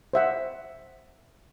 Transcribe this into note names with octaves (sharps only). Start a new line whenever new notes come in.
C5 E5 F#5